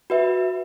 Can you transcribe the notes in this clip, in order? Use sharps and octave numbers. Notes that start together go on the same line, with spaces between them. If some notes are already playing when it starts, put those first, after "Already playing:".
F#4 B4 E5